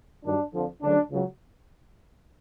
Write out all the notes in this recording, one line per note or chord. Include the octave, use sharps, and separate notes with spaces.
G2 D#3 F#3 D4
F2 D3 F3
D2 C#3 F#3 D4
C#2 C#3 F#3